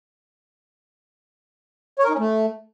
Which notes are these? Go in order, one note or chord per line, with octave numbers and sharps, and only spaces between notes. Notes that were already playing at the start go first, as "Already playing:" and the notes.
C#5
A#4
D#4
C#4
A3